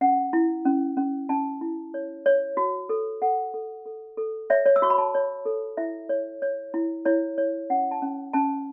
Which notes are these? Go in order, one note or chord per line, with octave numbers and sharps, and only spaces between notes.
C#4 F#5
E4
C#4
C#4
C#4 A5
E4
C#5
C#5
F#4
A4
A4 F#5
A4
A4
A4
C#5 E5
C#5
E6
F#4 C#6
B5
A5
C#5
A4
E4 E5
C#5
C#5
E4
E4 C#5
C#5
C#4 F#5
A5
C#4
C#4 A5